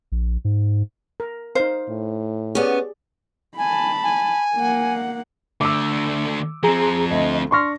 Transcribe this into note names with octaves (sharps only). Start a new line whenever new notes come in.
A#1
G#2
A#4
D#4 C5 F5
A2
B3 C#4 G4 G#4 D5
G#5 A5 B5
G#5
A#3 F#5
D3 A3 D6 E6
F3 C4 G#4 A#5
D2 D#5
D4 C6 C#6 F6 A#6